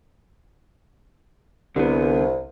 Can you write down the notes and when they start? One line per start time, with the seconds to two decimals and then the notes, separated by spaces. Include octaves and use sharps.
1.76 C2 D3 B3